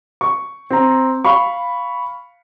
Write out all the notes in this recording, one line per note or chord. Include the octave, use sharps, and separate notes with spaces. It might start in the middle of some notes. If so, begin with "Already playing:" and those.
C#6
C4 A#5
F5 B5 C#6